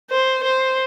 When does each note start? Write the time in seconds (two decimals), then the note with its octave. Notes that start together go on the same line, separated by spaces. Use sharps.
0.10 C5
0.43 C5